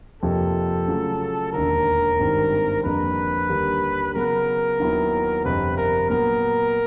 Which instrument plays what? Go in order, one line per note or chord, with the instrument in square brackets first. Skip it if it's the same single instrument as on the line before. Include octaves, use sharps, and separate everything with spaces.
[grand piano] F2 C3 F3 A#3 [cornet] A4
[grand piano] C#3 F#3 A3 C#4 F4
[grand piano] E1 D#2 D3 [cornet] A#4
[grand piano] G#1 G2 D#3 G3 C4
[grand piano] F2 D3 G3 A#3 D4 [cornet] B4
[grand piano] D#2 D3 G3 A#3
[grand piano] C#3 F#3 B3 [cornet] A#4
[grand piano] D#2 D#3 F#3 B3 E4
[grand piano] G1 F2 C3 [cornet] B4
[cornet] A#4
[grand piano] A#2 F#3 B3 [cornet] A#4